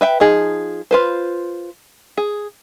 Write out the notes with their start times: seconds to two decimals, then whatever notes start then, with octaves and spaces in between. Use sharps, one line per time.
0.01 B4 E5 G5
0.20 F3 D#4 G#4
0.91 F4 B4 C5
2.17 G#4